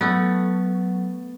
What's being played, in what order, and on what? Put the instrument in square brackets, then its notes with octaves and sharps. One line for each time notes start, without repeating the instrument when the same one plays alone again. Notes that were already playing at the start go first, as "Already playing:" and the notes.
[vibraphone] F#3 [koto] A3 B3